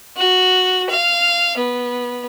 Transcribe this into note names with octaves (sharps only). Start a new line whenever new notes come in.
F#4
F5
B3